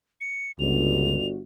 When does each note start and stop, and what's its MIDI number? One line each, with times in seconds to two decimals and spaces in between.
0.21 0.52 97
0.59 1.40 31
0.59 1.16 37
0.59 1.40 66
0.59 1.27 101